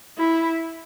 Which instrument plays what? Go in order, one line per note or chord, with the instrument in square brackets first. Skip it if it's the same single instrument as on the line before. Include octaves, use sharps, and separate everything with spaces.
[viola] E4